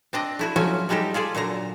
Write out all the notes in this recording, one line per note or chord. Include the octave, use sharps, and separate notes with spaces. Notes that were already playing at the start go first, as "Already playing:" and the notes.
C4 D4 D#5
A3 E4 F#4
F3 F#3 A3 C#4 F#4 G#5
G3 G#3 D#4 G4 A4
F4 G#4 A4 D5
A#2 D3 F#3 A#5